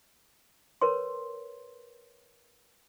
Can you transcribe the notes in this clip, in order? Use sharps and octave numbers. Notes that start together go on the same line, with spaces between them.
A#4 B4 C#5 C6